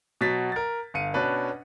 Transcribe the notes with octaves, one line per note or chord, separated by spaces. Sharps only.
B2 F#3 A6 B6
A#4 A6
G1 F5 C#7 D#7
B2 C#4 D4 B4